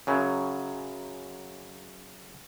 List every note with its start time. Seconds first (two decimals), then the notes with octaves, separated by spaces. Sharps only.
0.07 F#2 C#3 F#3